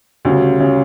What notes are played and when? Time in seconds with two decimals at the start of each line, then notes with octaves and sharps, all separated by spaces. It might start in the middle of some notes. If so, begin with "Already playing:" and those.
0.25 D2 C#3 G3
0.60 C#3 G3